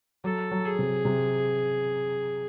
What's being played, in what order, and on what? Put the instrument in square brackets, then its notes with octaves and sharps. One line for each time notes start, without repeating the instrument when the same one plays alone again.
[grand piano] F#3 [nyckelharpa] A4
[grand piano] F#3
[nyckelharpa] G#4
[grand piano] C3
C3